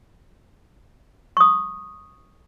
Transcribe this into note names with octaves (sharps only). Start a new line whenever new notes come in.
C#6 D#6